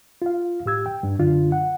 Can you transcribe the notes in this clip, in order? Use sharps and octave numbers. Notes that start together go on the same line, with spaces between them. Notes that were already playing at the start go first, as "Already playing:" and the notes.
F4 F5
A2 G4 E6 G#6
G5
G2 D4
F#2 D3 D4 F4
F#5